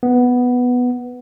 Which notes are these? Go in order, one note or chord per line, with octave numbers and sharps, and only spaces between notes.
B3